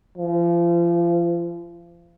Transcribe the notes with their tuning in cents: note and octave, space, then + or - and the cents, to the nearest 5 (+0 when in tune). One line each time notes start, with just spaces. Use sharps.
F3 -35